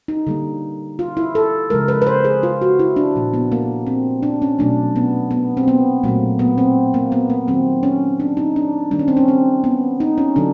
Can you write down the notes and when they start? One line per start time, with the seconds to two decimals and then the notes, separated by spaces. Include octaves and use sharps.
0.08 D#4
0.27 D3 G3 A#3
0.99 F4
1.17 E4
1.35 A4
1.70 C#3 F3 G#3 A#4
1.88 B4
2.02 B4
2.07 C5
2.25 G#4
2.43 F4
2.61 F#4
2.79 E4
2.96 D4
3.16 A#2 F3 A#3
3.34 B3
3.52 A#3
3.87 C4
4.23 D4
4.42 C#4
4.59 B2 F#3 A3 D4
4.96 B3
5.31 B3
5.57 C4
5.68 B3
6.03 A#2 F#3 A3 A#3
6.39 B3
6.58 C4
6.94 A#3
7.12 B3
7.30 A#3
7.47 D#3 F#3 A#3 C4
7.83 C#4
8.20 D4
8.37 D#4
8.56 D4
8.91 D#3 G3 A#3 D4
8.99 C#4
9.08 C4
9.17 C#4
9.28 C4
9.64 B3
10.00 D#4
10.18 C#4
10.36 D3 F#3 D4